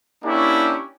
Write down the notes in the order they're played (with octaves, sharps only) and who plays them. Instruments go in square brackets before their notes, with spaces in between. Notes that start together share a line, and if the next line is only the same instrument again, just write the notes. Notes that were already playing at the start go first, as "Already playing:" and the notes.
[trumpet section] A#3 C#4 D4 E4 G4